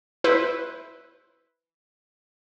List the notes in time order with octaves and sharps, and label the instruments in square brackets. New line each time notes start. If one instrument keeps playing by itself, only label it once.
[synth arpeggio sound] E4 B4 C5